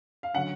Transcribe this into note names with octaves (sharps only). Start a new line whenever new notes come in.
F5
D3 F#3 C#4 F#5